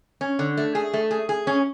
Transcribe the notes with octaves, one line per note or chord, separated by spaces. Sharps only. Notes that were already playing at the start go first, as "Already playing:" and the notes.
C#4
D3
A3
G#4
A3
G#4
G#4
C#4